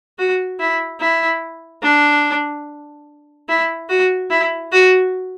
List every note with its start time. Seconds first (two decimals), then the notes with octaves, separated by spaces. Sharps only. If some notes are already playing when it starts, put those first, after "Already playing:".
0.18 F#4
0.60 E4
1.00 E4
1.83 D4
3.48 E4
3.89 F#4
4.30 E4
4.72 F#4